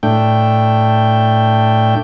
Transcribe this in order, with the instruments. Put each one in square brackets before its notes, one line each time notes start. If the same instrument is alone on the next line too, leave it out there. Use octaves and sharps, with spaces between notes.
[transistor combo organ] A2 A3 D4 G5